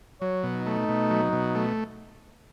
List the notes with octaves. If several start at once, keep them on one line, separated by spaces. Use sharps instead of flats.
F#3 C#5
B2
D#4
A3
B2
F#3
B2
A3